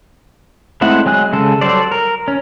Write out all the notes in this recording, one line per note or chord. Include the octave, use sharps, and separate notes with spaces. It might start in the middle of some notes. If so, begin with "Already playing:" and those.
G#3 A3 C4 E4 F#5
F#3 G#3 G#5 F#6
C#3 G#3 A4
F#3 G3 A4 C5 D5
A#4
C#4